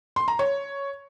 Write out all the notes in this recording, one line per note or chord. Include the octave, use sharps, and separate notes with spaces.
C6
A#5
C#5